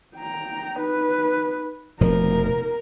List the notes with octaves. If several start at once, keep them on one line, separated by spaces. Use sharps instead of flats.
G5 A#5
D#4 B4
F1 B2 F3 A#4